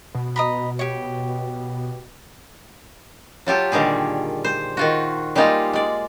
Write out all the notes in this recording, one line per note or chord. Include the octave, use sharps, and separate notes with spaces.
B2
D#5 A#5 B5
G4 C#5
F#3 F4 G4 A4
A#2 D3 D#3 G3 G#4
C5
D#3 F4 F#4
G3 G#3 A#3 D#4 F4
G#3 D5